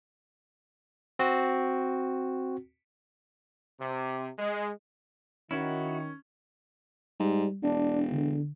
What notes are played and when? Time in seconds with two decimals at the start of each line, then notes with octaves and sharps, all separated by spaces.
1.19 C4 F#4
3.79 C3
4.38 G#3
5.51 D#3 C#4 E4 F#4
7.20 G#2 G3
7.62 E1 D4
8.12 D3